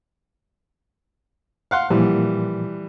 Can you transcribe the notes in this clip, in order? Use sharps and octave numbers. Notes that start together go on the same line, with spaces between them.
F5 F#5 C6
A#2 E3 F3 G3